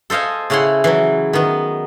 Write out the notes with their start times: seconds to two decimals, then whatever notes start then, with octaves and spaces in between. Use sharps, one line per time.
0.10 A4 C5 D#5 F5 G#5
0.50 C#3 C#4 E4 F#5 C6
0.84 E3 F#3
1.33 D#3 B3